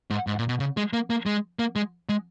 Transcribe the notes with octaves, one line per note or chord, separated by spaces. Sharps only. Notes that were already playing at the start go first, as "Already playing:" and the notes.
G#2
G#2
A#2
B2
C#3
G#3
A#3
A#3
G#3
A#3
G#3
G#3